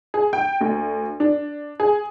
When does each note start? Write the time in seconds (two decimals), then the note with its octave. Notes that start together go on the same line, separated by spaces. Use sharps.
0.14 G#4
0.33 G5
0.61 D2
1.20 D4
1.80 G#4